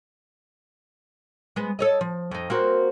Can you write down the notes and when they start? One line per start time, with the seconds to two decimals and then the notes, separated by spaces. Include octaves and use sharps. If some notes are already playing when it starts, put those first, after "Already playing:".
1.56 G#3 B3
1.79 A4 C#5 D#5
2.01 F3
2.31 F2 D#4
2.50 A#3 C4 F#4